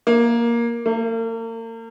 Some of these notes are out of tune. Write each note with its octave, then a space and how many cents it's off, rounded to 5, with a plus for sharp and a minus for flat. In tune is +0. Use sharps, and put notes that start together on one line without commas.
A#3 +10
A#3 -40